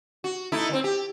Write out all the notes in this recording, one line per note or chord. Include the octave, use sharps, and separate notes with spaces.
F#4
A3 D#4 E4
D#3 C4
G4